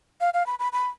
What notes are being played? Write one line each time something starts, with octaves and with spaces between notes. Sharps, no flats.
F5
F5
B5
B5
B5